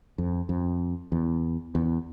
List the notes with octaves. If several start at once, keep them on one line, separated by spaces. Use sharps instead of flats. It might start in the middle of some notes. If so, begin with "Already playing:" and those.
F2
F2
E2
E2